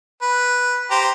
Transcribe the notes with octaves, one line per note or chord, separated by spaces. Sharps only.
B4
G4 C5 A#5